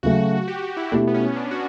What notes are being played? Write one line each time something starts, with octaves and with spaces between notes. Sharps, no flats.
C#3 F#3 A3 F#4
G4
F#4
E4
B2 A3 D4 E4 G4
B3
C#4
D4
F#4